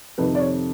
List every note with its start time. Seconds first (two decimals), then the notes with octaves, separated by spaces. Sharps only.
0.18 F2 C3 D#3 B4
0.35 D5
0.40 C#5